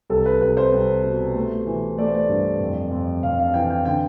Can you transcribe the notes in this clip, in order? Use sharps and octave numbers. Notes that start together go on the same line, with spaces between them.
C2 A4
B4
C2 B4
C5
C2
B2
A3
E3
A3 D5
C5
D5
G2
F2
F2
F2 F5
F5
E3 G5
G5
D3 G5